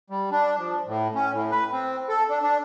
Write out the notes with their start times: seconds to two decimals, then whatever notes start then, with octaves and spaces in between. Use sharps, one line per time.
0.10 G3
0.32 D4
0.58 F3
0.87 A2
1.15 C#4
1.33 A2
1.51 B4
1.73 C4
2.09 A4
2.30 D4
2.43 D4